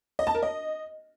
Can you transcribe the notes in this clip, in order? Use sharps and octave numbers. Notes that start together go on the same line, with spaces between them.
D#5
A5
A#4
D#5